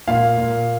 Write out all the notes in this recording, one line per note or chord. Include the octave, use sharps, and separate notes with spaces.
A#2 F5
A#2